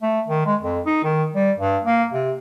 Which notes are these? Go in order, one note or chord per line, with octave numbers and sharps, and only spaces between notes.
A3
D#3
G#3
F2
D#4
D#3
G3
G2
A#3
C3